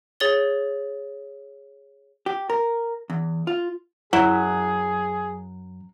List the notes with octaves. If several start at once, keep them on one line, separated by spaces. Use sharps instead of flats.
G#4 C#5 A6 G7
G4
A#4
E2
F4
F#2 F#3 E4 G#4